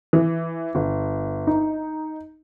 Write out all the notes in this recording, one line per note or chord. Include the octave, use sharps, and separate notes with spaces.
E3
G1
D#4